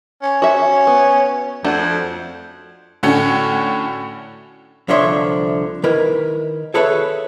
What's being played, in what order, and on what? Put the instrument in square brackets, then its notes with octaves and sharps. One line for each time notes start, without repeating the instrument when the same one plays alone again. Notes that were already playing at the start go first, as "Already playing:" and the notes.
[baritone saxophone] C#4
[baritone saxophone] C#4 [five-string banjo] F#4 E5
[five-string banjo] B3
[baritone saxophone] F2 [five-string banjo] A3 D4 F#4
[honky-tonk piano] A2 D3 A3 C#4 F#4
[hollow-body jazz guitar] C2 D3 F3 C#5 E5 C6
D#3 E4 A#4 B4
G#4 A4 B4 C#5 E5